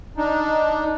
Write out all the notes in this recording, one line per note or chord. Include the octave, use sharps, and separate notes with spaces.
D4 D#4